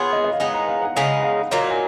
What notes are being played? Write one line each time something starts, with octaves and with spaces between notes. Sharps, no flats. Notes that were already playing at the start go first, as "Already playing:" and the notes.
Already playing: B3 F4 G#4 C#5
D#5
D#5
F5
G#3 B3 D#4 F#5
A#5
F5
F#5
C#3 G#3 D#4 F5
F#5
F5
A#2 F#3 A#3 D#4 F5
G#5